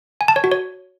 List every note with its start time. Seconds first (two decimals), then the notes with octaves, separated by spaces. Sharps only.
0.21 G#5
0.28 A5
0.36 C#5
0.44 F#4
0.52 C#5